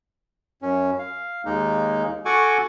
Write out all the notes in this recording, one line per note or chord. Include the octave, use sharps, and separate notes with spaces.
F#2 C#4
F5
D#2 G#3 A#3 D#4
F#4 A4 F#5 G#5 C#6 D6